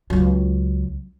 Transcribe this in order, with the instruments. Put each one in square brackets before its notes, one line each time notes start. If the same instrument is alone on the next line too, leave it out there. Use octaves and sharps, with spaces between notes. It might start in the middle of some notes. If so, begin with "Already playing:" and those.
[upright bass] C#2 F#3